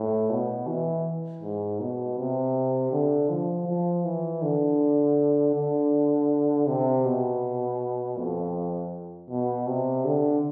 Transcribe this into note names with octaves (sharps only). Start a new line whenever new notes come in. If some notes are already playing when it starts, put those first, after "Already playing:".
Already playing: A2
B2
E3
G#2
B2
C3
D3
F3
F3
E3
D3
D3
C3
B2
F2
B2
C3
D3